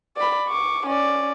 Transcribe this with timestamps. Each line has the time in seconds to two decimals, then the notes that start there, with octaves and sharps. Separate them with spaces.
0.17 D5 B5
0.48 C#6 D6
0.87 C#4 D5